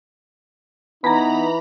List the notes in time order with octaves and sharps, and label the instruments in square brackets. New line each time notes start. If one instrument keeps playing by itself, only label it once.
[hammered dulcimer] E3 [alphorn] B3 [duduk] D#4 [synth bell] A#5 B5